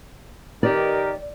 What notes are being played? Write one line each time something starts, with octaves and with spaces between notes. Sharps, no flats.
D#3 G4 A#4 D5